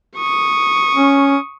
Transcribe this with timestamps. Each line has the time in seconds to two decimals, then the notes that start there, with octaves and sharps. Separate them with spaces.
0.17 C#6 D#6
0.97 C#4